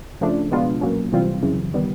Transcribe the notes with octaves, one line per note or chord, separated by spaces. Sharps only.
C#3 F3 A3 D4
B2 G#3 B3 D4 F4
A#2 F#3 A#3 C#4
C3 E3 G3 C4 F4
F#2 C#3 E3
D#3 G3 B3